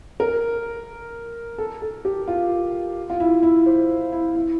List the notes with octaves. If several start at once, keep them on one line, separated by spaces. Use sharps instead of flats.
A#4
A4
A4
G4
F4
F4
E4
E4
C5
E4
E4